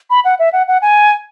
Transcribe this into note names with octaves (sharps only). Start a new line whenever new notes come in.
B5
F#5
E5
F#5
F#5
G#5